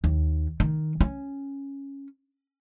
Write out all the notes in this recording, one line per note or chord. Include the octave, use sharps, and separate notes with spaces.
D#2
D#3
C#4